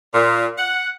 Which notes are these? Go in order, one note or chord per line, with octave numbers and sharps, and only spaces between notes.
A#2
F#5